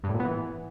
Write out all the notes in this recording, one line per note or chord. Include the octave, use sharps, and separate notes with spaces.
G2
A2
A#2
B3
E3